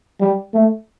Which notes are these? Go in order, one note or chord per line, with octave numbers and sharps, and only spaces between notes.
G3
A3